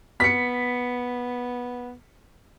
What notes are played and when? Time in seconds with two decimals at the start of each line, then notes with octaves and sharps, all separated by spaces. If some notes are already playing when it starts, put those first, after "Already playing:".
0.20 B3 B6 C#7